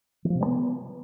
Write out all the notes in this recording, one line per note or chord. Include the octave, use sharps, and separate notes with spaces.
E3
F3
C3
G3
B3